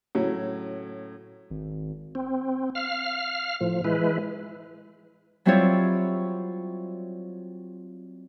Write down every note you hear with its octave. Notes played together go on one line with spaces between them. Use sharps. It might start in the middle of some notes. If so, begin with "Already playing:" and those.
A2 C#3 F#3
G#1
C4
F5 F6
A2 F3
E3 G#3 E4 B4
F#3 G3 C4 E4 F4 C#5